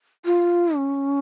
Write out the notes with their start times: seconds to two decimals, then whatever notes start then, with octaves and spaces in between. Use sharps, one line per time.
0.25 F4
0.76 C#4